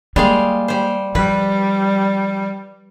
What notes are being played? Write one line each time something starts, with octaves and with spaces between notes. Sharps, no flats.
G3 G#3 A#3 F5
G3 C5
F3 G3 B4